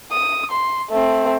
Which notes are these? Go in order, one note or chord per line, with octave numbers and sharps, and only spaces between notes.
D#6
C6
A3 C4